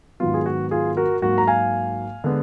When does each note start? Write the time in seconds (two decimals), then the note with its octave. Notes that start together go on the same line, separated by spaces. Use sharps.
0.20 G#2 D#3 F#3 B3 F4
0.34 G#4
0.46 F#4
0.71 F4 G#4
0.97 F#4 A#4
1.22 G#2 F#3 A#3 F#4 A#4
1.38 A#5
1.47 F5 G#5
2.24 D3 G#3 B3